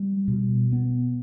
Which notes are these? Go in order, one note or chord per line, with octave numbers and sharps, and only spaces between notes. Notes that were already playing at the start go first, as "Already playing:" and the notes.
Already playing: G3
B2
B3